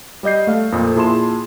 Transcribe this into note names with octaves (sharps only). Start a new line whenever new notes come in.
G3 D5 D#5 G6 C7
A3 A4 F5
F2 A#2 A4 D#6
A#2 E4 G#4 A5 C6 E7